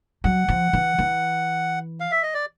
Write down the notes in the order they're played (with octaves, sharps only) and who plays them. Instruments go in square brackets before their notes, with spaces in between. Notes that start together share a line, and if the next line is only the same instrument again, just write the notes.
[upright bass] F#3 [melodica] F#5
[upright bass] F3
E3
E3
[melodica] F5
E5
D#5
D5